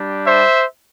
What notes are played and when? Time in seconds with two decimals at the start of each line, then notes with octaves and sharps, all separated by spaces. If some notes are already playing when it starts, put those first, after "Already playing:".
Already playing: G3 D4 G4
0.26 C5 E5